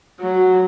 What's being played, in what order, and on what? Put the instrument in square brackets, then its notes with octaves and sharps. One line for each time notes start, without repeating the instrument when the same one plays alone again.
[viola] F#3